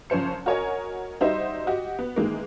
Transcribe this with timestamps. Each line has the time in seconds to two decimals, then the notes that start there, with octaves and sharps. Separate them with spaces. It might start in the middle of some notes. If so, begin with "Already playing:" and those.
0.10 F#1 F3 C#4 C5 C#7
0.46 F#4 A#4 C#5 D#5 G#5
1.21 G3 D#4 F#4 C5 D#5 E5
1.67 F#4 G4 D#5
1.99 B3
2.16 D#3 E3 G#3 A#3